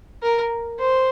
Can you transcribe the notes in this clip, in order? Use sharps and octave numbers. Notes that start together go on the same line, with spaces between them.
A#4
C5